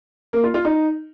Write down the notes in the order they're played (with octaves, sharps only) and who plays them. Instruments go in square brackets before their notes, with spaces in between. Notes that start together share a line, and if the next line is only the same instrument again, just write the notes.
[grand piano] A#3
F4
F4
D#4